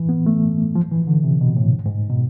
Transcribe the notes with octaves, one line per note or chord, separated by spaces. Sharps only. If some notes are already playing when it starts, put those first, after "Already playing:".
Already playing: E3
B3
A3
F3
E3
D3
C3
B2
A2
G#2
G#2
B2